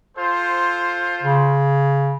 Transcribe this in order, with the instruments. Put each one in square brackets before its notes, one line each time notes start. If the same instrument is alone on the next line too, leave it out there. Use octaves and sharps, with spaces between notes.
[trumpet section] F4 A4 C5
[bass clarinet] C#3